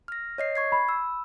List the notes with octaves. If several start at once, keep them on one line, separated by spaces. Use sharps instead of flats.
F6 A#6
C#5 D#5 C7
C#6 G#6 C7
B5
E6